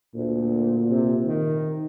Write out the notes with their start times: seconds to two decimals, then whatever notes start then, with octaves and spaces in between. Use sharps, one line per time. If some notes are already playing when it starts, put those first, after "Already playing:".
0.15 D2 A#2
0.90 C3
1.25 D#3